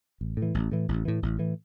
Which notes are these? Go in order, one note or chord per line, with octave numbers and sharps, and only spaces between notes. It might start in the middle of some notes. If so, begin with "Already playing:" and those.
A1
A2
E3
A1
A2 E3
A1
A2 E3
A1
A2 E3